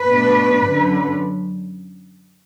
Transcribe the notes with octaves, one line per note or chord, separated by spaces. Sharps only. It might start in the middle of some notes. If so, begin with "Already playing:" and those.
Already playing: B4
B2 A3 D4
F#2 D3 F#3